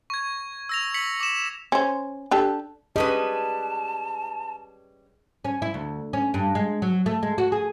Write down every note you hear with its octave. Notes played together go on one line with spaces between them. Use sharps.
C#6 G#6
E6 A#6 F7
B6 C#7 F#7
D6 E7
C#4 C5
D4 G4 A4
G3 C#4 G#4 B4 D#5 A5
C#4
E4
D2
C#4
G2
G#3
F#3
A3
G#3
F#4
G#4